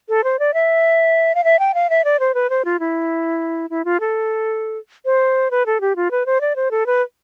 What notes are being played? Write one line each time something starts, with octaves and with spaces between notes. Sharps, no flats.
A4
C5
D5
E5
F5
E5
G5
F5
E5
D5
C5
B4
C5
F4
E4
E4
F4
A4
C5
B4
A4
G4
F4
B4
C5
D5
C5
A4
B4